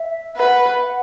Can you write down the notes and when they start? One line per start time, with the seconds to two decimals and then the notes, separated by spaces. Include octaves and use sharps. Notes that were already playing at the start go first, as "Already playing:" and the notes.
Already playing: E5
0.37 B4 F#5
0.77 E5
0.81 F#5